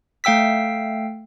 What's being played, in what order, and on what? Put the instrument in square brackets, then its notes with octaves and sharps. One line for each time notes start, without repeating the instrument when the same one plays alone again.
[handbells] A3 F5 G5 E6 B6